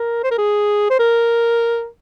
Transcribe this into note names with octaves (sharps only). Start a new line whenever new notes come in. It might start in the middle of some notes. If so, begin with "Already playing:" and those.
Already playing: A#4
C5
A#4
G#4
C5
A#4